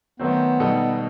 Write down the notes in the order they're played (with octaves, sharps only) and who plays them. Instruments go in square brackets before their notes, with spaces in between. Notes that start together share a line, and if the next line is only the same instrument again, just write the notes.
[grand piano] D#3 F#3 A3 C4 [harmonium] B3
[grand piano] B2 G3 D#4 A4
[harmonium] B3